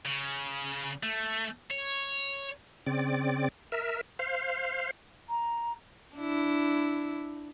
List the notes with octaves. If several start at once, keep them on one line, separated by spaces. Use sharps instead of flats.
C#3
A3
C#5
C#3 C4 D5
A#4 E5
C5 F5
A#5
D4 E4